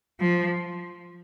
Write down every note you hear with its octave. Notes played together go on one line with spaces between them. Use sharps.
F3